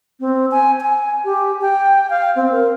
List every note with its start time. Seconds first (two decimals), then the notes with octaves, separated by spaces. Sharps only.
0.20 C4
0.51 G#5
0.80 G#5
1.25 G4
1.62 G5
2.10 F5
2.36 C4
2.52 A#4